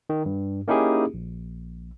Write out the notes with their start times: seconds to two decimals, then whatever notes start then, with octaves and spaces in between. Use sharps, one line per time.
0.10 D#3
0.26 G2
0.68 A#3 C#4 D#4 E4 G4 G#4
1.14 A#1